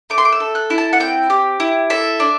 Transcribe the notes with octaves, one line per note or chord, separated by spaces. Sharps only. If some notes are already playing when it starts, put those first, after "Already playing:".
A3 D6
C6
D6
E6
A4
F#6
E4
A5
F#5
C4 G5
G4
E4
A4 E5
D4